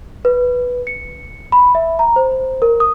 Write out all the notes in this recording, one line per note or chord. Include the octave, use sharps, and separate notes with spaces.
B4
C#7
B5
E5
A#5
C5
A#4
D#6